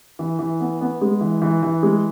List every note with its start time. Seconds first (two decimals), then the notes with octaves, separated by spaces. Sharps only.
0.19 E3
0.39 E3
0.60 B3
0.81 B3
1.01 G#3
1.21 E3
1.42 E3
1.63 E3
1.83 G#3